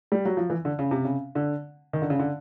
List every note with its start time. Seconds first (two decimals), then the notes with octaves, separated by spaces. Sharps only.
0.12 G3
0.25 F#3
0.37 F3
0.50 E3
0.65 D3
0.79 C#3
0.91 C3
1.05 C#3
1.35 D3
1.93 D#3
2.02 D3
2.10 C#3
2.19 D3